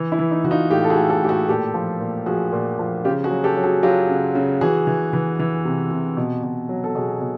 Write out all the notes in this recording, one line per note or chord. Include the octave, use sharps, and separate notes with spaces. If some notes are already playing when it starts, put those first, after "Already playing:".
Already playing: E3
E4
E3
D#4
E3 F#4
D#4 F4
A2 F4 G4
A4
F#4 G#4
A2
G4 A4
A2 G4
F#4 G#4
A#2 G4 A4
F3
A#2
F3 F#4 G#4
A#2
F3
C#3 F4 G4
F#4 G#4
F#3
G4 A4
F#3
F#4 G#4
F#3 F4 G4
C#3
C#3
E3 F#4 G#4
E3
E3
E3
C3
C3
B2
B2
F#3
A4
B2 F#4 G#4
B2